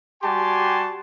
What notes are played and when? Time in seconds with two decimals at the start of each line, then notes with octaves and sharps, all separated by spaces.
0.23 G3 F#4 G4 G#5 A5 C6